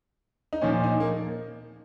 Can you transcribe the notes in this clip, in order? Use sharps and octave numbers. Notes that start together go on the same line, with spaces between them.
D#4
A#2 F3 C#4
D#4
A#3